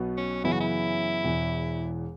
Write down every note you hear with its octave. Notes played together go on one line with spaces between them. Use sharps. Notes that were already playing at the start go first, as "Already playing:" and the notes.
Already playing: B1 B2 B3 F#4 B4
C#4
F#2 C#3 E3 B3 E4
F#4
E4
E1 E2 E3